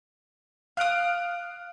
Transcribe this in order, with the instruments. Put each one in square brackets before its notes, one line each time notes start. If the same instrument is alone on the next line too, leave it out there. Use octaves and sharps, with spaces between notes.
[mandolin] F5 D#6 [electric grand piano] F6 F#6 D7